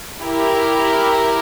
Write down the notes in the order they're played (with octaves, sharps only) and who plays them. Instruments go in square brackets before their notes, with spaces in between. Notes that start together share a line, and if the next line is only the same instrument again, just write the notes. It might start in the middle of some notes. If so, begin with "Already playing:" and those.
[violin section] E4 G4 A#4